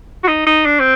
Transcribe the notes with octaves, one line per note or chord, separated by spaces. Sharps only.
F#4
D#4
D#4
D4
C4